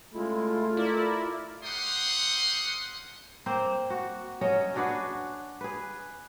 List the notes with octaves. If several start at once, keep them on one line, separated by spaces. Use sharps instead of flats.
C#3 G#3 A3 E4 F4
E4 A#4 D5
G4 C5 F5 F#5 C6 D#6
A#3 C4 C5
F#4
F#3 C#4 C#5 D#5
D4 F#4 G#4 B4
G#4 B4